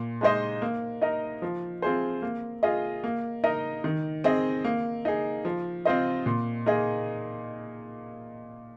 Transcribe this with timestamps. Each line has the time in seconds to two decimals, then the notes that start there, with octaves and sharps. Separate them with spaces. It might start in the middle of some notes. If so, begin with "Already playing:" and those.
Already playing: A#2
0.21 G#3 D#4 C5 D#5
0.62 A#3
1.01 D#4 A#4 D#5
1.42 F3
1.82 C4 F4 G#4 C5
2.22 A#3
2.63 F4 G#4 D#5
3.04 A#3
3.44 D#4 A#4 D#5
3.84 D#3
4.24 C4 G#4 D#5
4.64 A#3
5.05 D#4 G#4
5.45 F3
5.85 C4 F4 C5 D#5
6.26 A#2
6.66 A#3 D#4 G#4 D#5